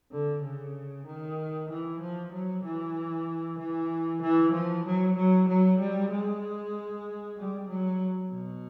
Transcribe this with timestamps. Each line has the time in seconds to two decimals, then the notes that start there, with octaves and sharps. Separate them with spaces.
0.12 D3
0.43 C#3
1.06 D#3
1.70 E3
2.01 F3
2.32 F#3
2.64 E3
3.59 E3
4.22 E3
4.53 F3
4.86 F#3
5.17 F#3
5.49 F#3
5.79 G3
6.12 G#3
7.38 G3
7.70 F#3
8.32 B2